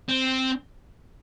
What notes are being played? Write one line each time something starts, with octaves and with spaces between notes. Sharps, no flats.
C4